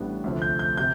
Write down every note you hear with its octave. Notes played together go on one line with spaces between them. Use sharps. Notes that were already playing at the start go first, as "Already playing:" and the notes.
Already playing: A1 A2 G3 B3 D4
D2 C3 F3 A3
G6
G6
C3 G6